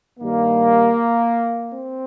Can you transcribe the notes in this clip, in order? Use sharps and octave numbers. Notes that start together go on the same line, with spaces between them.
G2 D#3 G3 A#3
C4